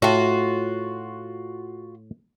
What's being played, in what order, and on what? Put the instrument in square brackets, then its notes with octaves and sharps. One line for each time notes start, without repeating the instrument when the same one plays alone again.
[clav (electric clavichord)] A2 [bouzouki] F4 F#4